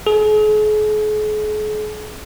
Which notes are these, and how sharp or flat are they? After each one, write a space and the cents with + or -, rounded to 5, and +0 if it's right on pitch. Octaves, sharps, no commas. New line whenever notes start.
G#4 +45